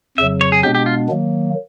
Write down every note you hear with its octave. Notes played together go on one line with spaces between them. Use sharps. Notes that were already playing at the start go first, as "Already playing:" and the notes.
F2 C#3 F#3 E5
C#5
G#4
B2 G#3 B3 D4 G4
G4
F4
D#3 F#3 A#3